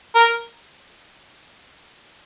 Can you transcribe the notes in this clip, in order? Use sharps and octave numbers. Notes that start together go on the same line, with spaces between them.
A#4